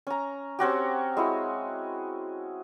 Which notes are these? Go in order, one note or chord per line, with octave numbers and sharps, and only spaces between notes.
C#4 A#5
C4 C#4 F#4 G4
G#3 E4 F#4